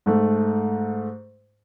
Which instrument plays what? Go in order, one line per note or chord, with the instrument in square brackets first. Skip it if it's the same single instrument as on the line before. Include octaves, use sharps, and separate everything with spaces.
[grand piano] G#2 A3